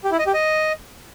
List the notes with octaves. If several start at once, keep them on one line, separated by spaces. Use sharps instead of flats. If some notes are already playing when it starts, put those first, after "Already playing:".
G4
E4
D#5
G4
D#5